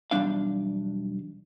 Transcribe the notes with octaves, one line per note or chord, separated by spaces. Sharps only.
B1 E2 G#2 G3 D4 F5